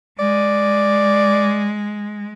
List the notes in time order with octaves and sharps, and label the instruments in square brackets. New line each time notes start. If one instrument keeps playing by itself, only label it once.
[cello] G#3 [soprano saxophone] D5